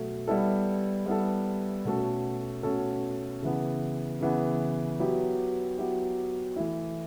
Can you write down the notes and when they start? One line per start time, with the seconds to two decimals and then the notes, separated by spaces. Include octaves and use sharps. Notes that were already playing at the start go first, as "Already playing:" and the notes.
Already playing: B2 F#3 A3
0.28 G3 B3 E4 A4
1.06 G3 B3 E4 A4
1.85 B2 A3 C#4 F#4 A4
2.63 B2 A3 C#4 F#4 A4
3.42 C#3 E3 B3
4.21 C#3 E3 B3
5.00 F#3 B3 E4 G4
5.78 F#3 B3 E4 G4
6.56 E3 A3 E4